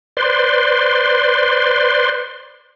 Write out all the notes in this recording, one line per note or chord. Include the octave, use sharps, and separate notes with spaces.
B4 C5 D5 C6